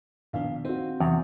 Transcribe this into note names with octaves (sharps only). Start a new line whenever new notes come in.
A#1 B2 D#3 B3 F5
C4 D#4 F#4
E2 C3 E3 C#6